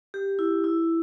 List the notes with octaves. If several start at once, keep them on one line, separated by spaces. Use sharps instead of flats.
G4
E4
E4